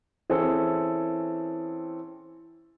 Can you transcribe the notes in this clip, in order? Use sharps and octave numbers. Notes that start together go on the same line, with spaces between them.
E3 C4 C#4 G#4 A4